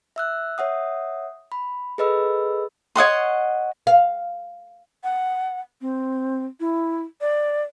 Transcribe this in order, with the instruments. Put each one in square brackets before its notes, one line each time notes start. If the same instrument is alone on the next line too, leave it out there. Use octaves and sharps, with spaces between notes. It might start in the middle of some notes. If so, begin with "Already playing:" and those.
[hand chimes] E5 E6 F#6
C#5 E5 F#5 D#6
B5
G#4 A4 B4 D#5 B5 E6
[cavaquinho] C#5 D#5 F#5 C6
[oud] F5
[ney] F#5
C4
E4
D5